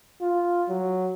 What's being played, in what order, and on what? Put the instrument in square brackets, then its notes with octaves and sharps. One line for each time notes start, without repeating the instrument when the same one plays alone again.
[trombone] F4
F#3